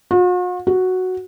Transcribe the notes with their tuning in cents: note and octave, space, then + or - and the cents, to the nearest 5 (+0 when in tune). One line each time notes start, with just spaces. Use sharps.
F#4 -45
F#4 +0